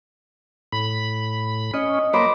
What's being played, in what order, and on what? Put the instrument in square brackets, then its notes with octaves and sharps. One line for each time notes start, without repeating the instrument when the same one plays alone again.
[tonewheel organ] A2 B5
[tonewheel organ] C#4 [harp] D#5
[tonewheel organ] F#3 A#3 [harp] C5 B5 D6